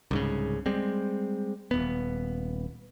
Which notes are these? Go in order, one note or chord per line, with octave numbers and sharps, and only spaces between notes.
C2 G#2 C#3
G3 G#3 C4
D#1 B3